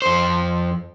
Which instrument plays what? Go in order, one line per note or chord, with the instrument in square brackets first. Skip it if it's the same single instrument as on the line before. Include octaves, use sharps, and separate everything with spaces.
[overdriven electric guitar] F2 C5